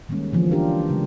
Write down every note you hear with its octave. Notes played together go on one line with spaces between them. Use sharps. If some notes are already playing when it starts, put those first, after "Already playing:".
D#3 G3 G#3 A#3 C#4
D3 E3 F3 A#3 B3
E3 F3 D4 F4 G4 A#4
C#3 F#3 G#3